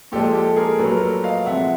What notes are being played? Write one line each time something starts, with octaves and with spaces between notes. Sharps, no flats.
A#2 F3 G#3 G4 A4
G4 A4
G#4 A#4
A#2 F#3 A3 A4 B4
A#4
A4 B4
D#5 F5
C3 F3 G#3 E5 F#5